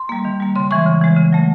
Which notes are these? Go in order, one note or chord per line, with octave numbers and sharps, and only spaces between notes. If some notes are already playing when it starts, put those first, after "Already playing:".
Already playing: C6
G3 A#3
D#3
G3 A#3
C#3 C6
E3 G#3 C#6
C#3
E3 G#3
C#3
F#3 A3